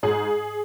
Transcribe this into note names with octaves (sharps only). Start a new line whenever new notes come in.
G#2 G#4